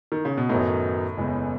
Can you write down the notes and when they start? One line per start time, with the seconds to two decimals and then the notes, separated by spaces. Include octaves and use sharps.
0.12 D#3
0.25 C#3
0.37 B2
0.49 F#2 A2 D#3 F#3 B3 D#4
1.17 F#1 E2 C#3 E3 G#3